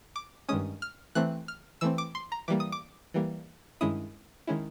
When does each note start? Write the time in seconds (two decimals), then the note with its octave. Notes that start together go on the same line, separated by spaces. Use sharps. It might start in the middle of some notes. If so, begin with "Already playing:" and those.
0.16 D6
0.49 G2 D#3 G#3 C#4 D#6
0.82 F6
1.15 E3 A3 C4 F#6
1.48 F6
1.81 E3 A3 C4 E6
1.98 D6
2.15 C6
2.32 A#5
2.48 E3 G3 A#3 D6
2.60 D#6
2.72 D6
3.14 E3 G3 A#3
3.81 G2 D#3 G#3 C#4 E4 D#6
4.47 D#3 G#3 C#4 E4